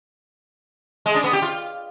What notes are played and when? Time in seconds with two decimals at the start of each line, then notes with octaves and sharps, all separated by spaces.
1.06 G#3
1.15 D4
1.24 B3
1.33 G4
1.42 F4